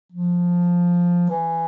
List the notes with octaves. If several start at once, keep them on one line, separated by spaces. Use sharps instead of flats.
F3
E3